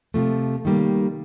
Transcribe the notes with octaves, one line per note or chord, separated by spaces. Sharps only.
C3 F3 A3
D#3 G3 A#3